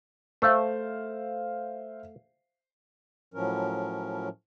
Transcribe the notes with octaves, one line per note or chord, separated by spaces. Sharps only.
A3 C5 E5 F5
A2 F3 F#3 C#4 A#4